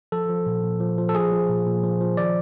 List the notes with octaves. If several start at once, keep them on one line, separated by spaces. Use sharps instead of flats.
F3 A4
F3
A#2
A#2
F3
F3
A4
F3 G#4
F3
A#2
A#2
F3
F3
D#3 D5